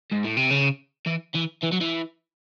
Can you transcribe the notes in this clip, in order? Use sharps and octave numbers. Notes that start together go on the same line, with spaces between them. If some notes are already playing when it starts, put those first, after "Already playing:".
G#2
A2
C3
C#3
E3
E3
E3
F#3
E3